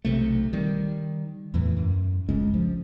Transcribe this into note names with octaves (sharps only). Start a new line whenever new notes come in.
B1 C3 A3
D#3 G3
E2 A2 E3
F#2
G1 C#2 G#3 C#4
F3